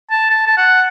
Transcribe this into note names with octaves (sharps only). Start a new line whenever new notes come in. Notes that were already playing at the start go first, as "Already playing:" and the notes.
A5
A5
A5
F#5